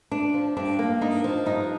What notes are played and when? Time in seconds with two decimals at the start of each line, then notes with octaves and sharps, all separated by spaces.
0.11 D4
0.34 F3
0.57 G2 D4
0.79 A#3
1.01 D4 D#4
1.24 F3
1.46 G2 D#4